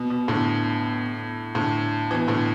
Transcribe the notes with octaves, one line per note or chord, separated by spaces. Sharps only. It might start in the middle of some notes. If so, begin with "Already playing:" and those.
Already playing: B2
B2
A2 D3
A2 D3
B2 E3
A2 D3